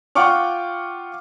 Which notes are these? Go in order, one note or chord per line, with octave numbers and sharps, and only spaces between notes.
F4 F#5 G5 C#6 D6 F6